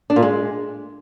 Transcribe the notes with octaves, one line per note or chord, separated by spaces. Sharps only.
D4
A#2
G#3